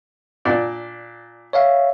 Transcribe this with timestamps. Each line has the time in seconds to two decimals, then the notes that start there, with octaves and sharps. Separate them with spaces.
0.45 A#2 D4 D5
1.53 C#5 E5 F5